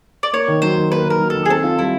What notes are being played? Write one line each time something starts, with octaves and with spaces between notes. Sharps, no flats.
D5
A#3 C#5
D#3
F#3 C5
D#3
A#3 B4
D#3 A#4
F#3
D#3 A4
G#4
C4 A4
F4
G3 E4